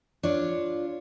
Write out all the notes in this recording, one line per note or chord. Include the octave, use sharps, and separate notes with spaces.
D4 F4 C#5